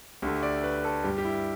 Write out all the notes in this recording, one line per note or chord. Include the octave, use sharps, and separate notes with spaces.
D2 D3 A3 G4
D5
B4
A4
G2 G3 G4
G4
E4